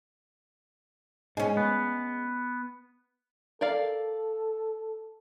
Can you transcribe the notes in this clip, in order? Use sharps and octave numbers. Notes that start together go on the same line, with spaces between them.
G#2 G#3 C#4
B3
A4 A#4 D5 F5